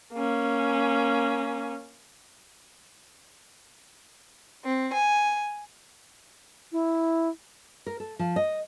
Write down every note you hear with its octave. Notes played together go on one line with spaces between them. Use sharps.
A#3 C#4
C4
G#5
E4
A#4
A4
F3
D#5